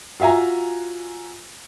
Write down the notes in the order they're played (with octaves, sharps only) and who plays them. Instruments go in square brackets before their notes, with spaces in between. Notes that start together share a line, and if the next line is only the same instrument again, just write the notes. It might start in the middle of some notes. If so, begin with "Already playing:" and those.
[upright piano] F4 F#4 E5 G#5 A#5